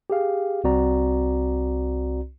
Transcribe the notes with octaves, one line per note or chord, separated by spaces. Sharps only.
G4 G#4 F5
C2 C4 F#4 D5 A#5